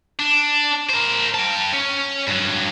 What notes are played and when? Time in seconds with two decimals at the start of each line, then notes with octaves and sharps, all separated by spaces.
0.19 D4
0.90 A#4 C5
1.34 G5 A5
1.73 C#4
2.27 G2 F#3